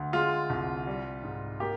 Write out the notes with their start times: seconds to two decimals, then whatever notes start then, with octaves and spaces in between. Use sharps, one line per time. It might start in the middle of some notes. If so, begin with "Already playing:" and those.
Already playing: D2
0.13 G#3 F4
0.50 C2
0.87 G3
1.23 G#2
1.60 A#3 G4